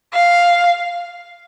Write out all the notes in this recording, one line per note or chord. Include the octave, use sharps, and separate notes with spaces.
F5